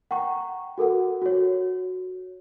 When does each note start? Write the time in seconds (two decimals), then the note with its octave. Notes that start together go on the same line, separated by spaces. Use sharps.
0.11 F#5 G5 A#5 C#6
0.78 F#4 A4 A#4 F#5
1.22 F#4 C#5